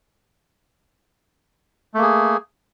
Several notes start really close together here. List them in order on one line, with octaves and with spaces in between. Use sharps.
A3 A#3 G#4